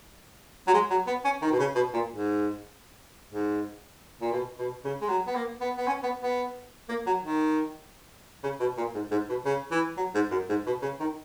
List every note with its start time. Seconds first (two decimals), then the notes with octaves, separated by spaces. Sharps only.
0.67 F#3
0.74 G#3
0.90 F#3
1.07 B3
1.25 C#4
1.42 D#3
1.51 B2
1.59 C#3
1.75 B2
1.93 A#2
2.10 G#2
3.29 G#2
4.21 A#2
4.32 B2
4.59 B2
4.84 C#3
5.01 G#3
5.09 F#3
5.27 B3
5.35 A#3
5.61 B3
5.77 B3
5.87 C#4
6.03 B3
6.21 B3
6.89 A#3
7.06 F#3
7.23 D#3
8.43 C#3
8.60 B2
8.77 A#2
8.95 G#2
9.11 G#2
9.29 B2
9.45 C#3
9.71 E3
9.97 F#3
10.14 G#2
10.31 F#2
10.49 G#2
10.66 B2
10.82 C#3
11.00 D#3